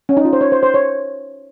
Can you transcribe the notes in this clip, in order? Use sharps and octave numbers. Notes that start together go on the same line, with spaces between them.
C#4
D#4
F4
C5
C#5
C5
C5
C#5